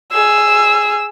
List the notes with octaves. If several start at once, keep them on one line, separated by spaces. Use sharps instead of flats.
G#4 E6